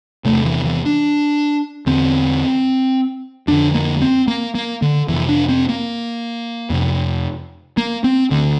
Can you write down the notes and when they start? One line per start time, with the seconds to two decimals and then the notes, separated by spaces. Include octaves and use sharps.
0.25 E2 C3 A3
0.45 E3
0.65 E3
0.86 D4
1.86 E2 D3 C4
3.47 F2 D3 D4
3.74 A#3
4.02 C4
4.28 A#3
4.55 A#3
4.82 D3
5.08 F2 C3 E3
5.29 D4
5.49 C4
5.69 A#3
6.70 F2 C3
7.77 A#3
8.04 C4
8.31 D2 D3